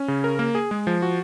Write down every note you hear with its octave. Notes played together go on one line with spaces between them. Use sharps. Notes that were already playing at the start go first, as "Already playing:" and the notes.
Already playing: C#4
C#3
A#4
A#3
G#4
G#3
F3
F#4